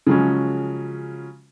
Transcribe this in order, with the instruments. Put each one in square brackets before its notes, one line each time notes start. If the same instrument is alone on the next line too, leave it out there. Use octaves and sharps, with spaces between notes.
[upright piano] C#3 F3 F#3 G#3 C#4